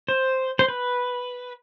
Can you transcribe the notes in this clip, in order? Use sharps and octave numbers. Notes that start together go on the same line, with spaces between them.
C5
C5
B4